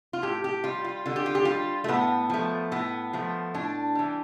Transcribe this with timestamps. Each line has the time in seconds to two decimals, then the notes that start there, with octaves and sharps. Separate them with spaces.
0.13 F4
0.22 A2 G4
0.44 G4
0.64 G3 F4
0.85 F4
1.06 D3 F4
1.16 G4
1.26 F4
1.35 G4
1.45 G3 F4
1.84 A3
1.88 A2 B3
2.30 F3 A3
2.72 A2 B3
3.13 F3 A3
3.54 A2 D4
3.95 E3 G3